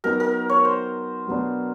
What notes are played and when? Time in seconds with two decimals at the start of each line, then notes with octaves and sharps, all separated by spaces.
0.04 F#3 B3 D#4 A#4
0.20 A#4
0.49 C#5
0.65 C5
1.27 B2 F#3 B3 D4